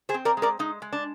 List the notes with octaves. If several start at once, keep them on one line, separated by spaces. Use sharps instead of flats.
G#4 C5
C4
A#4 D5
G#3
A#4 D5
G#3 D#4
G#3
D4